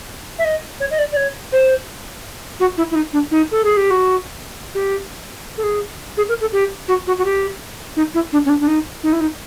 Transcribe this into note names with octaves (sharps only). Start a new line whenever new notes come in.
E5
D#5
C#5
D#5
D5
D5
C#5
C5
F#4
E4
E4
D#4
D4
D#4
A4
G#4
G4
F#4
G4
A4
G#4
G#4
A#4
A4
G4
F#4
F#4
F#4
G4
D#4
E4
D4
C#4
D4
D4
D#4
D#4
E4
D#4